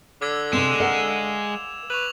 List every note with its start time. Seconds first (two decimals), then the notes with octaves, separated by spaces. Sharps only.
0.21 D3 D6 E6 G#6
0.53 C3 G#3 C4 E7 F7
0.80 A#4 F5 F#5
1.90 B4 C#6 F7 F#7